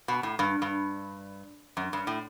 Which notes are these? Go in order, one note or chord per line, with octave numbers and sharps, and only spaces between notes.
B2
A2
G2
G2
F#2
G2
A2